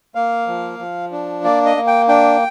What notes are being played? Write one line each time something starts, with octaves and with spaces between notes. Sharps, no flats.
A#3 F5
F3
F3
D4
A#3 D5
D#5
A#3
G5
D4 G5